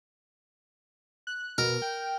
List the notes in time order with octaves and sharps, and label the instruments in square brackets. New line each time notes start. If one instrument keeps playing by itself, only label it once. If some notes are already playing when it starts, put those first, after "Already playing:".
[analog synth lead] F#6
[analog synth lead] B2 [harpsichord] A#4
[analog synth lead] G5